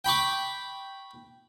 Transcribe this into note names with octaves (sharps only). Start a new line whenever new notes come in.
G5 B5 C#6 D6